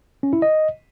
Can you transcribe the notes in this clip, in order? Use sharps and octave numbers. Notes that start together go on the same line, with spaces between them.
C#4
E4
D#5